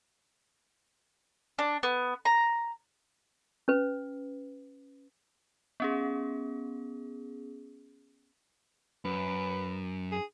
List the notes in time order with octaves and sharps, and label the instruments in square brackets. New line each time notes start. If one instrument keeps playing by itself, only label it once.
[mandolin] D4
B3
A#5
[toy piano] C#4 B4
[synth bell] B3 C#4 G#4
[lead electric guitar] F#2 [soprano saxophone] B4
[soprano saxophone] G#4